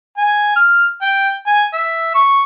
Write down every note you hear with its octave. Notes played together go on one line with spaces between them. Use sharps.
G#5
F6
G5
G#5
E5
C#6